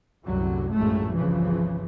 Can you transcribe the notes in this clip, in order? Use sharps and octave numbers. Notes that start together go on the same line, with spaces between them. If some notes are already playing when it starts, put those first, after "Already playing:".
C2 F#2 A2 D3 F#3
A#1 F#2 A2 G#3 A3
G1 C2 C#3 E3 F3